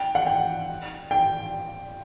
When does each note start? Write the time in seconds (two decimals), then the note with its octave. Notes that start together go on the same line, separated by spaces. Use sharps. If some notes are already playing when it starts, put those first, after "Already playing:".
Already playing: G5
0.15 F#5
0.26 G5
1.11 G5